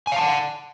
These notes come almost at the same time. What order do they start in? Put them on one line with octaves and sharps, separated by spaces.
G#5 F5 A5 F#5